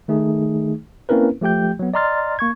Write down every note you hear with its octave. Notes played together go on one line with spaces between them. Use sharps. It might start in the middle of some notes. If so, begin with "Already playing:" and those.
D#3 A3 D#4 G#4
A#3 C4 C#4 E4 A#4 B4
F3 A3 G4 G5 G6
F#3 B3
D5 D#5 A#5 C6 F6 A6
A#3 C#6 G#6